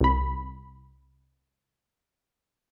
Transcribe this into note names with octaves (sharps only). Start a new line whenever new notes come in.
C2 B5